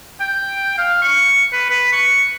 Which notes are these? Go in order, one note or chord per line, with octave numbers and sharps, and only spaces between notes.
G5
F5
C#6
B4
B4
C#6